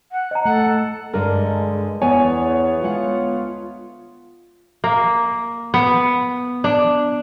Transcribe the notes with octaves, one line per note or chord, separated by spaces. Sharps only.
F#5
D#5 A#5
A3 A4 F#5
G2 D3 G#3 A#4 D5
E2 E3 B3 C#5 G#5
D2 G#3 F4 F#5
A#3
B3
D4